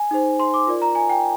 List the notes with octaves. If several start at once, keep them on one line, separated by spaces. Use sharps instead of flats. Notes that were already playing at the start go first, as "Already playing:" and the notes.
Already playing: G#5
D#4 G#4 C5
C6
D6
F4 A#4 D5
A#5
G#5
G5